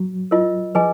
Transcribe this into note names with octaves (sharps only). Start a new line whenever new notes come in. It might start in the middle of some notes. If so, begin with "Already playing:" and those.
Already playing: F#3
F4 A#4 D#5
F3 G#4 B4 D#5 G#5